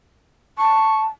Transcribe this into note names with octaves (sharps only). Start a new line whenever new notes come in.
A5 C#6